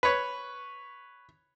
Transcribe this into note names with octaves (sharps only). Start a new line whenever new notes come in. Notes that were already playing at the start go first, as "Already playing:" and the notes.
B4 C#5